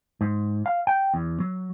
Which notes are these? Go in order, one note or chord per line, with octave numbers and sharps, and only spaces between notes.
G#2
F5
G5
E2
F#3